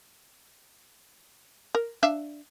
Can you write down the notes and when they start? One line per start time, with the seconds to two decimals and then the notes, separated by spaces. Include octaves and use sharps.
1.75 A#4
2.03 D4 E5 F5